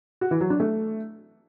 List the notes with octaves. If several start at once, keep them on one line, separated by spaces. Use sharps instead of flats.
F#4
E3
F#3
D4
A3